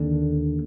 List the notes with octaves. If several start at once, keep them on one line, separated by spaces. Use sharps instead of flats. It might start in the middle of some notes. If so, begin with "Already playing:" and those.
Already playing: D#2 D3